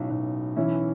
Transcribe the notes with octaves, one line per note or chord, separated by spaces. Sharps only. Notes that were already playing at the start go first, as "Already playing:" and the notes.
Already playing: B1 A2 F#3 C#4
B1
E3 C#4 E4